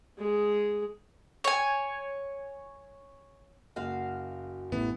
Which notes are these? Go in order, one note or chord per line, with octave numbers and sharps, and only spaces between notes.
G#3 G#4
C#5 G#5
F#1 F#4 F5
A1 E3 B3